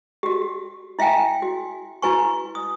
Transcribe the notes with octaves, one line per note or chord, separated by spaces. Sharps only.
F#4 G4
E4 E5 F5 G5 G#5
F#4
E4 F#4 B4 G#5 C#6
D#6